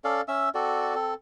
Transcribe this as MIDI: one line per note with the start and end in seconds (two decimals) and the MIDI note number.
0.04 0.21 61
0.04 0.21 69
0.04 0.21 74
0.04 0.21 77
0.28 0.49 61
0.28 0.49 76
0.28 0.49 88
0.55 0.95 60
0.55 0.95 66
0.55 0.95 69
0.55 0.95 74
0.95 1.14 60
0.95 1.14 69